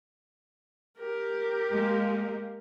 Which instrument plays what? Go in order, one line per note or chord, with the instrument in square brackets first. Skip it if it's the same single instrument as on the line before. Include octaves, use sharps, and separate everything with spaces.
[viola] G4 A#4
[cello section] G#3 A#3